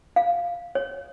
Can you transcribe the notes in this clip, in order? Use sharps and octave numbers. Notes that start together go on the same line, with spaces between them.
F5
C#5